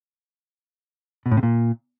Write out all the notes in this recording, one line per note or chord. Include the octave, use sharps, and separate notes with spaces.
B2
A2
C3
A#2